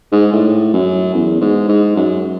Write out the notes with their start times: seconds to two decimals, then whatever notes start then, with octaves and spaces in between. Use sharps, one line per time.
0.12 G#2
0.33 A2
0.74 F#2
1.14 E2
1.41 G#2
1.69 G#2
1.96 F#2